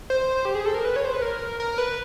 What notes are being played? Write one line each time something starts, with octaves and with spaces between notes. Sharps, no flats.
C5
G4
G#4
A4
A#4
B4
C#5
C5
B4
A#4
A#4
B4